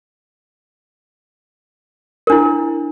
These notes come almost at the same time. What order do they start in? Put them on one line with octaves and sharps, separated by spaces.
A#4 D4 E4